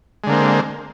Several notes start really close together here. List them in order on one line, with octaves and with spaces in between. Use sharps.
G#3 D3 A#3 C4